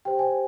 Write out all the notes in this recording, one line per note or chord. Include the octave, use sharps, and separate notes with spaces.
G4 C5 G5
G#5